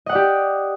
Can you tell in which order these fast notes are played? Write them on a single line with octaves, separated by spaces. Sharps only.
D#5 F#5 D5 G4